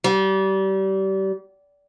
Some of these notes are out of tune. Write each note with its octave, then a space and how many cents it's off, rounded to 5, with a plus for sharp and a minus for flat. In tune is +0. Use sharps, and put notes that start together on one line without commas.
G3 -30